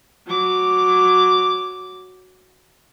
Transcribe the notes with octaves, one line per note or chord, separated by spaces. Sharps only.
F#3 D6